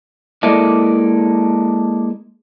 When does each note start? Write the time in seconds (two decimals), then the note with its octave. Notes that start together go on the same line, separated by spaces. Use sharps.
0.43 G#3 A#3 E4 A4 D5 D#5